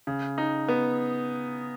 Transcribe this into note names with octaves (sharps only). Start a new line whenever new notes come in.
C#3
D#4
B3